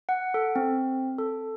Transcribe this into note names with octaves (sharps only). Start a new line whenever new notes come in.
F#5
A4
C4
A4